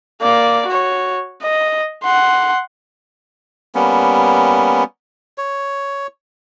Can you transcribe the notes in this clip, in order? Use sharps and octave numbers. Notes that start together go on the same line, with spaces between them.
A#3 D5
F#4 C#5
D#5
F#5 C6
G3 A#3 B3 C#4
C#5